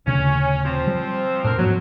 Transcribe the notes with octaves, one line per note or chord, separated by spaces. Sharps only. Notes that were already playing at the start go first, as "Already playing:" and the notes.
D#1 D2 C#3 C#4
F3 C4
G3
A2 D4 A#4 C5
G#2 F3 F#3 B3